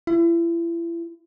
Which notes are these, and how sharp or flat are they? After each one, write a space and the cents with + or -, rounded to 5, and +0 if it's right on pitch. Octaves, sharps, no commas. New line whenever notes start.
E4 +35